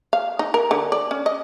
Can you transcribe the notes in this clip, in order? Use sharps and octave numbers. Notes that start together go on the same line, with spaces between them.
F5
D#4
A#4
D3
D5
C#4
D#5